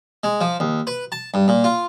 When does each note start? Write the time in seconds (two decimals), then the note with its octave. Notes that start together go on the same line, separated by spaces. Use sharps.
0.24 G#3
0.41 F3
0.60 D#2
0.87 B4
1.12 A5
1.34 G2
1.48 A#2
1.64 F4